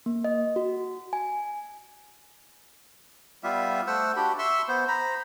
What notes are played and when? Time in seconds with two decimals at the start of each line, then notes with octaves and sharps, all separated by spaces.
0.06 A#3
0.24 D#5
0.56 F#4
1.13 G#5
3.43 G3 B3 F4 E5
3.87 A3 C5 F#5 E6
4.16 D4 F#4 G4 B5
4.39 E5 C6 C#6 E6
4.68 B3 C5
4.88 C5 A#5 B5